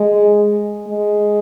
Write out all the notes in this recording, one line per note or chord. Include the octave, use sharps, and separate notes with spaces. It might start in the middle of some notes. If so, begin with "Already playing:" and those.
Already playing: G#3
G#3